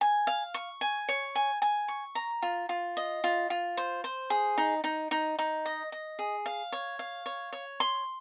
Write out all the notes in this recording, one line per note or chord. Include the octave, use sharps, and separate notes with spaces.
G#5
F5
C#6
G#5
C#5
G#5
G#5
C#6
A#5
F4
F4
D#5
F4
F4
C5
C5
G#4
D#4
D#4
D#4
D#4
D#5
D#5
G#4
F5
C#5
F5
C#5
C#5
C6